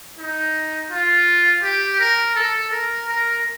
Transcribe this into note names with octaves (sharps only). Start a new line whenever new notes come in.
D#4
F4
G4
A#4
A4
A#4
A#4